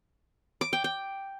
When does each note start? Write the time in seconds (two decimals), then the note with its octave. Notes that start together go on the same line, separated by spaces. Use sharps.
0.61 D6
0.73 G5
0.84 G5